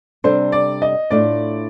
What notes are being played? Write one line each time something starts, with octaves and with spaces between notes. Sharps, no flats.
C3 G3 D4 A4 C5
D5
D#5
A2 A3 D4 F4 D5